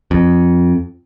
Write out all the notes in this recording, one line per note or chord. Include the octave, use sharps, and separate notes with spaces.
F2